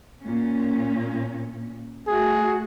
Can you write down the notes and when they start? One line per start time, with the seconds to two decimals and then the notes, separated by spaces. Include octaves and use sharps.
0.22 A#2 C#4
2.07 A3 F#4 G#4